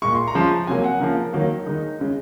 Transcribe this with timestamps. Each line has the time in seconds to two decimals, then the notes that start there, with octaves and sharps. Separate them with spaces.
0.02 A#2 G#3 C#6
0.15 C6
0.27 A#5
0.35 C#3 F3 G#3
0.40 C6
0.67 C3 F#3 A#3 G#5
0.84 F#5
1.00 C#3 F3 A#3 A#4
1.33 D#3 F#3 A#3
1.66 D#3 G#3 D#4
2.00 C#3 G#3